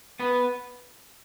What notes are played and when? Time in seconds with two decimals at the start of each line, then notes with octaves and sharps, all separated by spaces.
0.19 B3 B4